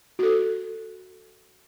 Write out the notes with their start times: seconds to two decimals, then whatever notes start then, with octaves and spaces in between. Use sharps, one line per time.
0.19 F#4 A4